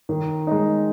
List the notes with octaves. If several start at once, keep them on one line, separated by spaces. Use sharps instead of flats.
D#3
G#3 D#4